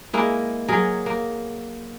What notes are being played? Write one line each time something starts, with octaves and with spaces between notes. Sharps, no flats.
G#3 A#3 E4
F#3 G#4 A#4
A#3